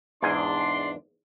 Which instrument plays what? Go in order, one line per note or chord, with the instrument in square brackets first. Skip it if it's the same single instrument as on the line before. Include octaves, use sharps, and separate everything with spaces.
[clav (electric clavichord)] E2 G#2 G#5 [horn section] D4 D5 C6